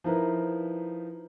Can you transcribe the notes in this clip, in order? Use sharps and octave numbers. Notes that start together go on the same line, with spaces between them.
F3 D#4 E4 A#4 B4